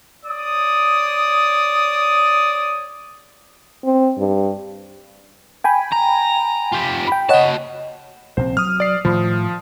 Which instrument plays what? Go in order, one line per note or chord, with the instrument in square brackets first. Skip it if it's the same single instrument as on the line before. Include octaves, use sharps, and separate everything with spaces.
[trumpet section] C#5 D5 D#6
[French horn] C4
G2
[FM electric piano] G5 G#5 B5
[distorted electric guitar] A#5
F4 G4
[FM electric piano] G5 B5
[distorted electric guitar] F#4 A5 [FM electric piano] C#5 D#5 F#5
[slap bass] A#1 C3 C4 [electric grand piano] C5
[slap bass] F#3 [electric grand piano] D#6 F6
[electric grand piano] D5 C7
[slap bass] A2 D#3 [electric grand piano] F3